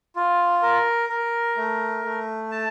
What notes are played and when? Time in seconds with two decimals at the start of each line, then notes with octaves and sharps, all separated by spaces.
0.16 F4
0.62 A#4
1.09 A#4
1.57 A3
2.04 A3
2.51 A5